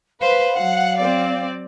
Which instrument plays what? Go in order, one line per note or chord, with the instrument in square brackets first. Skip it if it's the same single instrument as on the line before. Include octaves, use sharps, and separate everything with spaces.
[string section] B4 [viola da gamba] C5 [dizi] F5
[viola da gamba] F#3 [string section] F#5
[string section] C4 D5